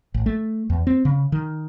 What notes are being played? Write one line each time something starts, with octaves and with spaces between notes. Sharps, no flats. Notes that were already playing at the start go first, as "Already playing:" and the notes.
A1
A3
E2
C4
C#3
D#3